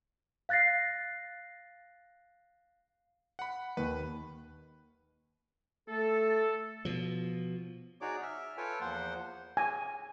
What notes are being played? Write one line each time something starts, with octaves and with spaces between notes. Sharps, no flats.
F5 F#6 A6 A#6 C7
F#5 B5
D#2 B4
A3 A4
B2 F3
D#4 F#4 G#4 C#5 D5 D6
E5 F6
F4 A4 B4 C#5 G5 G#5
E2 F3 A#3 C5 F#5 C6
G#5